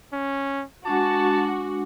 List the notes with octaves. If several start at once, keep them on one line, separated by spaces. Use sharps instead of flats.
C#4
G#3 D4 F#4 A5 D6